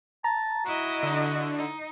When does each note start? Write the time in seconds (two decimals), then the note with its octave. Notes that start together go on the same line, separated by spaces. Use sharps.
0.24 A5 A#5
0.65 E4 F#4 D#5
1.03 D3
1.54 D#4